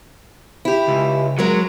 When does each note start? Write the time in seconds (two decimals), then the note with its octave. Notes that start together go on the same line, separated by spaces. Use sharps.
0.65 E4 G4
0.88 C#2
1.39 F#3 G#3 A#4